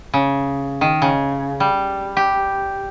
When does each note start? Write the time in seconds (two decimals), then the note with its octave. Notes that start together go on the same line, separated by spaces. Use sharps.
0.14 C#3
0.81 D#3
1.02 C#3
1.60 G3
2.17 G4